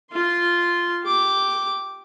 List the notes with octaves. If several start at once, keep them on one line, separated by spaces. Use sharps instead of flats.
F4 C6
G4 D6